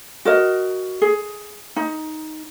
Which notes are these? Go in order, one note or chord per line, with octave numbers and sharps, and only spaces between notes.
F#4 A#4 D#5
G#4
D#4